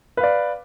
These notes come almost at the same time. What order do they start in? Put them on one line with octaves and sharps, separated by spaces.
B4 F5 D5